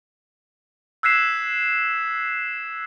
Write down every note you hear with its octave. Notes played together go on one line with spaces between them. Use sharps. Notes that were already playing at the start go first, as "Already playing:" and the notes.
E6 F#6 G#6 B6 C7 E7